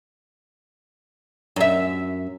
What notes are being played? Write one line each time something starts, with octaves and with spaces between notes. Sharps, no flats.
F#2 E5